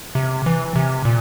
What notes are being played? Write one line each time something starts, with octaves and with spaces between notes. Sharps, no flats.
C3
E3
C3
A#2